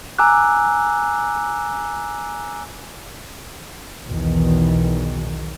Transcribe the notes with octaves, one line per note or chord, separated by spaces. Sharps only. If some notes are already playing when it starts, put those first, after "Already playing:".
G#5 A#5 D6 E6 F#6
B1 E2 B2 D#3